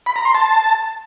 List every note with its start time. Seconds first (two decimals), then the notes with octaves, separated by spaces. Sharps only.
0.06 B5
0.16 A#5
0.25 C6
0.35 A5